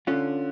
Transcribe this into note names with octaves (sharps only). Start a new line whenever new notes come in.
D3 C#4 F4